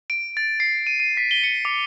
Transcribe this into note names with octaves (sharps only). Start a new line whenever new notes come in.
D7
A6
C7
D#7
D#7
B6
G7
C#7
D6